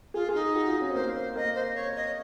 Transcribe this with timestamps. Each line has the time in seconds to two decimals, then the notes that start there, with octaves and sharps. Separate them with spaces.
0.14 F4 G#4
0.29 G#4
0.34 D#4
0.55 F#4
0.68 F4
0.81 C#4
0.90 C4
0.95 A#3 C5
1.16 C5
1.36 A#3 D#5
1.55 C5
1.75 C#5
1.96 D#5